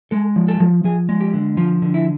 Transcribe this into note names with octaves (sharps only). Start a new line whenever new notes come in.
G#3 A4
F3
A4
F3
F3 G#4
G#3
G4
D3
F3 F4
D3
E4